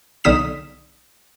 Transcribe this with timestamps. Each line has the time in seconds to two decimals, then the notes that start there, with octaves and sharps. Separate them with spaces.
0.24 B1 D3 D#4 D#6 B6 E7